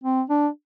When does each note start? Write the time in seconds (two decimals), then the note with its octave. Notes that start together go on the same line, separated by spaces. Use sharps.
0.04 C4
0.30 D4